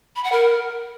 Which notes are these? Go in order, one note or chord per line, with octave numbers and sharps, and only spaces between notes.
B5
F#5
A#4